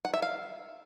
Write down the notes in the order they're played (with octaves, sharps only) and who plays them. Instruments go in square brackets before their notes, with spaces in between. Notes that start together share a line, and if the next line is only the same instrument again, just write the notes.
[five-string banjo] F#5
E5
F5